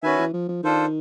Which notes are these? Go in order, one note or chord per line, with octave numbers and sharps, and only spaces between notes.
D#3 C#4 F#4 B4 E5 G#5
E3
F3
F3
D#3 D4 F4 A4 C5